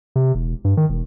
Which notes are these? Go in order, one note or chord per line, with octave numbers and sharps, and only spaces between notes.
C3
E1
G2
D#3
E1